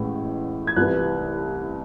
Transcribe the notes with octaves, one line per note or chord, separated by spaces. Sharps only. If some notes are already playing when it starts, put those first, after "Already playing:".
Already playing: A1 A2 G#3
G#6
C2 C3 E3 F#6